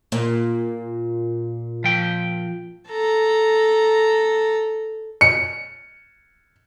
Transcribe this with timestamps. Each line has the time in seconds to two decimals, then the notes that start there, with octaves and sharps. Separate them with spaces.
0.12 A#2
1.84 F3 G5
2.88 A4 A#5
5.21 C#7